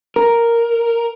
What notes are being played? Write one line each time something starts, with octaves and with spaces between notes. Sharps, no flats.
A#4